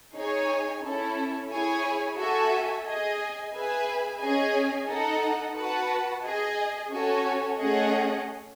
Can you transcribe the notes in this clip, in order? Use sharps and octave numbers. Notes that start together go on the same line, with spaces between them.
D#4 G#4 C#5 G#5
C#4 E4 A4
E4 G#4 C#5 G#5
F#4 A4 E5 G#5
G#4 D#5 G#5
G#4 B4 E5 G#5
C#4 G#4 D#5 G#5
D#4 A4 D#5 F#5
F#4 B4 F#5 A5
G#4 D#5 G#5
C#4 F#4 A4 C#5 G#5
A3 C#4 G#4 D#5 F#5